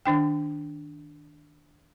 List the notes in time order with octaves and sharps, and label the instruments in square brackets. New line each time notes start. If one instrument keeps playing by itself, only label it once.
[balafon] D#3 D4 G5